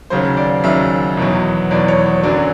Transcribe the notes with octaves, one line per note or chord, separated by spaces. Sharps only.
D#2 C#3 F#3 C5
D5
D#2 C#3 F#3 E5
E2 B2 F#3
E2 B2 F#3 D5
C#5
C#5
F#2 D3 F#3 D5